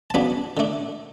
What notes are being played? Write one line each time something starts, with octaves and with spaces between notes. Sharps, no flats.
A5
C#3 F#3 B3 D4 B5
D3 A3 D4